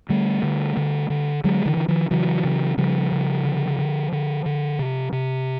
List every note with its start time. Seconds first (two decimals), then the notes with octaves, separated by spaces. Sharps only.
0.09 D3 G3 A3
0.43 D3
0.77 D3
1.10 D3
1.44 D3 F#3 G#3
1.66 D3 E3
1.77 D3
1.88 D#3 F3
2.10 C#3 E3 F#3
2.44 C#3
2.78 C#3 F3 G3
3.12 C#3
3.45 D3
3.79 D3
4.12 D3
4.46 D3
4.79 C3
5.12 C3